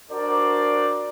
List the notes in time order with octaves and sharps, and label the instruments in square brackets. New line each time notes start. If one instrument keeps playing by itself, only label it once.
[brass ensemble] D4 F#4 A#4 C5 D5